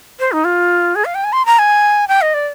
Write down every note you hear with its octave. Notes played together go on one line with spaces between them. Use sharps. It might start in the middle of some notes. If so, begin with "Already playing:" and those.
C5
D#4
F4
G#4
F5
G5
G#5
C6
A#5
G#5
G5
D#5
D5